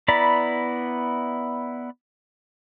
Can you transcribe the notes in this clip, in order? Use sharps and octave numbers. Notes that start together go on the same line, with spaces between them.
B3 E4 D5 A#5 B5